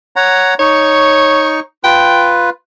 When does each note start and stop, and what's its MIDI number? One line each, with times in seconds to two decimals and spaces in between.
0.16 0.54 73
0.16 0.54 78
0.16 0.54 82
0.59 1.60 63
0.59 1.60 73
0.59 1.60 85
1.84 2.50 65
1.84 2.50 71
1.84 2.34 79